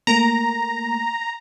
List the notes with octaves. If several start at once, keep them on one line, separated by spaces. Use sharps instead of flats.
A3 A#3 A#5